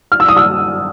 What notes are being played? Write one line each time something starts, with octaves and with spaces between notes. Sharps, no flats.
F6
E6
D#6
E6